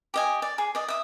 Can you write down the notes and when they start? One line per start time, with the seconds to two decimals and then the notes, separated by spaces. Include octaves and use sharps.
0.14 G4 D#5 G#5
0.42 D5
0.58 G#4
0.75 D5 D#5
0.88 E5 D#6